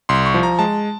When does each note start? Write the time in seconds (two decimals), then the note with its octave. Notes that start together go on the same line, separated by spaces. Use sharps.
0.09 C2 C6
0.26 C#6
0.34 F3
0.43 A#5
0.59 G#3 A5